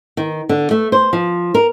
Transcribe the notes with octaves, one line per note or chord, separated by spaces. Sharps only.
D#3
D3
A3
C5
F3
A#4